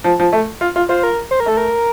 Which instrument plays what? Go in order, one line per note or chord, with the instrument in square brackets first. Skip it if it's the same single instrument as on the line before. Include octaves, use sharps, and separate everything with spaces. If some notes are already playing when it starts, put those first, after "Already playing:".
[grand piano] F3
F3
A3
F4
F4
[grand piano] F4 [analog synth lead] C5
[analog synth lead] A#4
C5
A#4
[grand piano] A3 [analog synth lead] A4
[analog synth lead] A#4